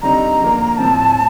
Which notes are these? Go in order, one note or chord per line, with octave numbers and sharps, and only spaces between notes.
D3 G3 C4 D#4 A#5
D3 F3 A#3
A2 F3 C4 A5